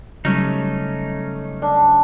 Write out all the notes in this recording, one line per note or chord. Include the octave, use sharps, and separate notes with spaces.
C#3 F#3 G3 A3 C#4 D#4
D4